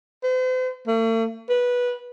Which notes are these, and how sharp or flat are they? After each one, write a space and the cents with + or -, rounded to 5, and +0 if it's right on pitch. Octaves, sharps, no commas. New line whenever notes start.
C5 -40
A3 +45
B4 -15